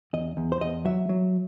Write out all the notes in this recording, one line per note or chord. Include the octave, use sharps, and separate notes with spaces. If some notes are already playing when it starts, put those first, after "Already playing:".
E2 D#5
E2
C5
E2 D#5
F#3 E5
F#3